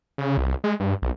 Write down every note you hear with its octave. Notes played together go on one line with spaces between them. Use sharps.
C#3
C2
G#3
G2
B1